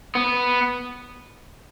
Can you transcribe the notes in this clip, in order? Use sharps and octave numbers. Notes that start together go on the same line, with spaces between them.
B3